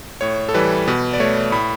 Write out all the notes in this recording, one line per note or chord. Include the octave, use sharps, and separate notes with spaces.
A2 C#5
A4
E3 G3 B4
B2 B4
D5
A3 C#5
A2 B5